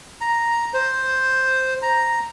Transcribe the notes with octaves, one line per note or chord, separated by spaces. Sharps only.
A#5
C5
A#5